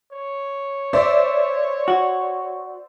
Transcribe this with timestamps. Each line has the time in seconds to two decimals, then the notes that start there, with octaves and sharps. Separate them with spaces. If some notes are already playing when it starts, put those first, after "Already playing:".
0.12 C#5
0.93 C5 D5 E5
1.88 F#4